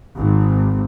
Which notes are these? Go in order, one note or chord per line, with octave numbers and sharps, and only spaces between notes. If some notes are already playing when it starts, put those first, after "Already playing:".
G#1